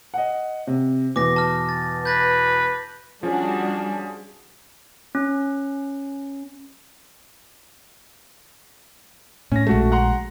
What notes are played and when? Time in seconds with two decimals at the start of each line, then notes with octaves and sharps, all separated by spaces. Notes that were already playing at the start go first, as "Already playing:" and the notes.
0.14 D#5 F#5
0.67 C3
1.16 E2 B2 D6 A#6
1.36 A5 F6
1.69 A6
2.05 B4 G6 A6 A#6
3.23 F3 G3 C#4 D4 F#4 G#4
5.15 C#4
9.52 A2 C#4 A#6
9.67 A#1 G#3 A3 F#4
9.92 F#5 A#5 C6